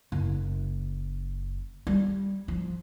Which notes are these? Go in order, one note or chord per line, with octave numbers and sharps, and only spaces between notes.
F#1
G3
F3